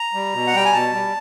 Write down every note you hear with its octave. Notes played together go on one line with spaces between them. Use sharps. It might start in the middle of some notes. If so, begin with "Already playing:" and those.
Already playing: A#5
G3
B2
F#5
G3 G5
G#5
B2 A5
G3